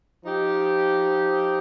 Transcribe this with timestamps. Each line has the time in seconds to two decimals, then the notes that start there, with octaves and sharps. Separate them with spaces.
0.23 F3 D#4 G4